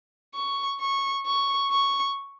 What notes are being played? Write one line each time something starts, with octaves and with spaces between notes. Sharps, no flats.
C#6
C#6
C#6
C#6